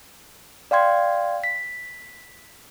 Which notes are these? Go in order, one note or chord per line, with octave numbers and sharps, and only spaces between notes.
D5 F5 G5 C6 G#6
B6